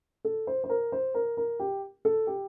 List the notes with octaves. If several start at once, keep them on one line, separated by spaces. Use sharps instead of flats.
A4
C5
C5
A#4
C5
A#4
A#4
G4
A4
G4